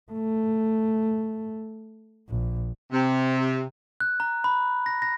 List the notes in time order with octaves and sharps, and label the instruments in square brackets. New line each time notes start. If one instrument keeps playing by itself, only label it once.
[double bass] A3
A#1
[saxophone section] C3
[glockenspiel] F#6
A#5
B5
A#6
A#6